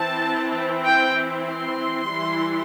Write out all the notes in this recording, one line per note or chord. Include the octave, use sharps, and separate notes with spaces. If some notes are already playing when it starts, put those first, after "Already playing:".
Already playing: E3 C4 E4 A5
G5
C6
E3 G3 E4